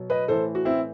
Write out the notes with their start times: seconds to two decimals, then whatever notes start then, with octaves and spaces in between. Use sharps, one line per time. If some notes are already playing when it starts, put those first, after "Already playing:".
Already playing: B2 F#3
0.10 B4 D#5
0.28 A2 E3 A4 C5
0.55 F#4
0.65 C4 E4